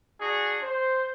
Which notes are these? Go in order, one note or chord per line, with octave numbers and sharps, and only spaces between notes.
D4 F#4 G#4
C5